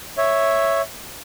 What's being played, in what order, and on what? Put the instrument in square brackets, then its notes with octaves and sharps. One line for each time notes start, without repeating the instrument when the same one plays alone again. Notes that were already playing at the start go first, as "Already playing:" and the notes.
[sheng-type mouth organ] C#5 E5